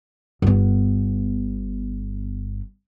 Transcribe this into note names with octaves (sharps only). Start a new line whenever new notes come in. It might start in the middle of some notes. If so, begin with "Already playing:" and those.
G1 B3